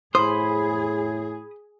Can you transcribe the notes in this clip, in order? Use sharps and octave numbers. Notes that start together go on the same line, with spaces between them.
A2 G#4 C5 B5 D#6